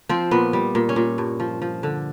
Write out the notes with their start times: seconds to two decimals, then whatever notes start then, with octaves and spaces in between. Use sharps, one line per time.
0.09 F3 C4
0.31 A#2 B3
0.53 G3
0.75 A#2
0.89 C#4
0.96 A#2
1.18 G2
1.40 F3
1.62 F3
1.83 D3